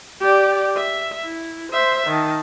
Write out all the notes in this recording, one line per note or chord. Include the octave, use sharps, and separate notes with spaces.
G4 D5
E5
E4
C5 E5
D#3 A5